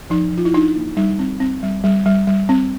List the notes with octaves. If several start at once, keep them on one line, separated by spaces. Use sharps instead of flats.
F3 D#4
F3
F4
E4
D4 D#4
A#3
G3 D#4
C4
C4
G3
G3
G3
G3
C4